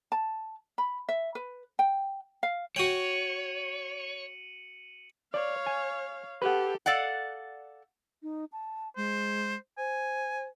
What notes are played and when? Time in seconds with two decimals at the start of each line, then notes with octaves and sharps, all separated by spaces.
0.12 A5
0.78 B5
1.09 E5
1.35 B4
1.79 G5
2.43 F5
2.76 F#4 C#5 G5 C#7 D#7 F#7
5.34 C#5 D5 F5
5.67 G#5
6.42 G4 A4 B4 F#5
6.86 A4 D5 F5 F#5
8.23 D#4
8.52 A5
8.97 G#3 C5
9.78 C5 G#5